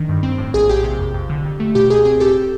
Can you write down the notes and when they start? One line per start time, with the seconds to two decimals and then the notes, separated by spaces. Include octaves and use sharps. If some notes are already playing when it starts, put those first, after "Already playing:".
Already playing: D#3 D4
0.09 G2
0.23 C4
0.38 A2
0.54 A#1 G#4
0.69 A#1 G4
0.84 C3
0.99 F2
1.14 F2
1.30 D3
1.45 F2
1.60 A3
1.75 B2 G4
1.90 C#2 G#4
2.05 C4 G#4
2.20 A2 G4 A4